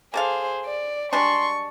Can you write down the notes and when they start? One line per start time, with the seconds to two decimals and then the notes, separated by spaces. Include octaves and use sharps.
0.14 A#3 G#4 A4 C5 F5
0.65 D5
1.13 G3 G#3 D4 C6 C#6